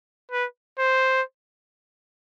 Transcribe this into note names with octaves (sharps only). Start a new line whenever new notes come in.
B4
C5